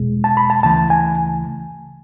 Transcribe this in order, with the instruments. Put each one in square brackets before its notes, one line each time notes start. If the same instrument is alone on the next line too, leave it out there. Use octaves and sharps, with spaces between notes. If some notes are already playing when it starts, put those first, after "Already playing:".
Already playing: [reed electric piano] E2 B2 G#3
A5
B5
A5
D2 C#3 E3 A3 A5
G#5